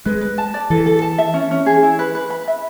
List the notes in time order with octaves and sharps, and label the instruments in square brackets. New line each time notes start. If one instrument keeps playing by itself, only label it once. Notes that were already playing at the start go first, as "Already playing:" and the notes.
[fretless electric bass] G#3 [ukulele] B4
[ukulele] B4
A5
D5
[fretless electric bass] E3 [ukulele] A4
[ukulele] A4
A5
E5
C#4
C#4
G#4
E4
B4
B4
B5
E5